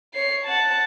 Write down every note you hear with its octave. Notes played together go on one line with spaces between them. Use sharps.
C#5 C7
F#5 A5